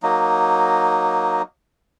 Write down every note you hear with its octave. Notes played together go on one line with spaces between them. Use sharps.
F#3 A#3 D#4